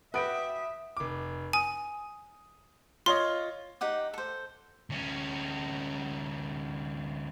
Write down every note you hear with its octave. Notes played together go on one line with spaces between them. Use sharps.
F#4 B4 D5 E5 G5 D#6 D7
F1 D6
G#5 D#6
F4 C#5 D#5 C6
D#4 G4 F#5 D6
A4 C5
D2 C#4